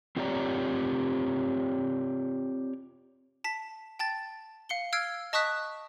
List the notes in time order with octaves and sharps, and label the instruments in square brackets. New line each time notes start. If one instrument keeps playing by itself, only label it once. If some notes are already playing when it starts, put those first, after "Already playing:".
[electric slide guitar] C4 F4 G4 C#5 D5 A#5
[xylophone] A5 B6
G5 A5 A6
F5 C#7 G7
E6 F6 G#6 C7 D7
D#5 A5 C#6 D#6 F#6 B6